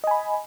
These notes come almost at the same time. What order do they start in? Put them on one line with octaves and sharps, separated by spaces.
D#5 G#5 B5